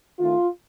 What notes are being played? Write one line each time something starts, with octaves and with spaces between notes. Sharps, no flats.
D#3 A3 C4 F4